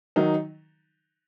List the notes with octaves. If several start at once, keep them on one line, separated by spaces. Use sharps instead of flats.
D#3 F#3 D#4